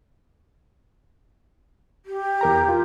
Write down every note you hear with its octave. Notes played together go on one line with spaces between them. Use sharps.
G4
E2 A#4 A#5
F4